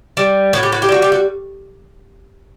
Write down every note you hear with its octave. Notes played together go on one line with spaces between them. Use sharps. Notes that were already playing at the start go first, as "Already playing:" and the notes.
G3
A2 F#4
G4
F#4
G4
G3 F#4
G4
F#4